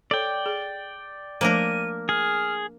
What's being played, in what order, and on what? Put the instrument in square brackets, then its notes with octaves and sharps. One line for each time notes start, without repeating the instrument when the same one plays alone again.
[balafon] A4 C#5 [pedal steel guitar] D5 G5
[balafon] G#4
[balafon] F3 A3 C5 [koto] A#3 D4 A#4 [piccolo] D#7
[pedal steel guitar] G#4 [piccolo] F6